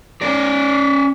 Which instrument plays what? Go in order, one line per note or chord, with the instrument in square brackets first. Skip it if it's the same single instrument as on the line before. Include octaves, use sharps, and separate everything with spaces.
[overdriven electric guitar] C#4 D5